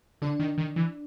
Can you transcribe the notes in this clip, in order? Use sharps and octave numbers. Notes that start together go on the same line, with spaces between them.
D3 D4
D#3
D#3
E3